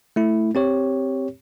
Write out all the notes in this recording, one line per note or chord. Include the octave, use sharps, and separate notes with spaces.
A3 E4
C4 G4 C#5